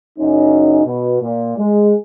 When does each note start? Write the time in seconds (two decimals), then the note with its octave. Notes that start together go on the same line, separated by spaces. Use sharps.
0.19 F#1 F#2 C#4 D#4
0.86 B2
1.22 A#2
1.57 G#3